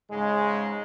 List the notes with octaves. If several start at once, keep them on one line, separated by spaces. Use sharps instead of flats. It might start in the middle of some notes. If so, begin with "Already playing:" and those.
G#2 C#3 G#3